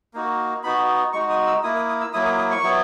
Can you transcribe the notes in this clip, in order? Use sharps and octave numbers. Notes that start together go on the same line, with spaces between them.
A#3 D#4 F#4
B3 D#4 F#4 B5
G#3 D#4 F#4 C#6
D#6
E6
A#3 E4 D#6
D#6
D#6
E6
F#3 A#3 E4 D#6
D#6
D#6
C#6
F#3 B3 E4